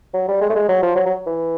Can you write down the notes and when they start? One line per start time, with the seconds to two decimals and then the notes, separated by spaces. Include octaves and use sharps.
0.14 F#3
0.28 G3
0.41 G#3
0.49 A3
0.55 G#3
0.69 F#3
0.82 F3
0.95 F#3
1.06 F#3
1.27 E3